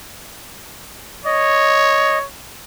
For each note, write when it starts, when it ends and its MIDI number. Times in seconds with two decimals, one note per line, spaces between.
1.25 2.25 73
1.25 2.18 75